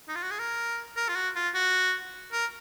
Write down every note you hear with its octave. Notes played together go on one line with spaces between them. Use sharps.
D#4
F4
F#4
G#4
A#4
A#4
F4
F#4
F4
F#4
A#4